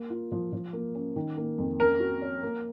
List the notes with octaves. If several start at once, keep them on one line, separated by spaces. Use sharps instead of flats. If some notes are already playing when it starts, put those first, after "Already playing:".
Already playing: A#3
F4
F3
F3
A#3
C#4
D#3
A#3
F2
C#4 A#4
F#4
C#5
A#3